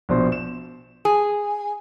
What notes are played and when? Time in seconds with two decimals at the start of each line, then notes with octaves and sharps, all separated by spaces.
0.09 A#1 B2 C5
0.32 E7
1.05 G#4